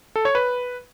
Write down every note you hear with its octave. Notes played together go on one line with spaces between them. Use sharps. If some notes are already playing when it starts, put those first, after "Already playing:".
A4
C#5
B4